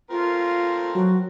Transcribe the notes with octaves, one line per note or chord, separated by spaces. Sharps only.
A3 C4 F4 A#4
F#3 F#4